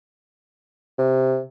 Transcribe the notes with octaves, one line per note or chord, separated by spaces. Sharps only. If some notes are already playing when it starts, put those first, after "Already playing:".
C3